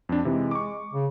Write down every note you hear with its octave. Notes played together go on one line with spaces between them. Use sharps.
F2 D4
C3 E3 G#3 D#4
C#6 D6
C#3